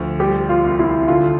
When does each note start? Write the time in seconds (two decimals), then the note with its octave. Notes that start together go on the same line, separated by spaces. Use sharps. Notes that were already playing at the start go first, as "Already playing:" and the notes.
Already playing: D2 F3
0.20 G3 G4
0.49 F4
0.64 C2
0.79 E4
1.08 D3 F4